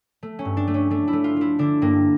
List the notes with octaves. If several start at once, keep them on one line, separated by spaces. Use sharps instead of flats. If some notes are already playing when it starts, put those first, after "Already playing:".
A3
C#4
G2
D4
A3
C#4
A3 D4
E4
A3
F4
A3 E4
D3 D4
G2 A#3